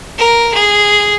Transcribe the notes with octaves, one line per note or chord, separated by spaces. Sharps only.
A#4
G#4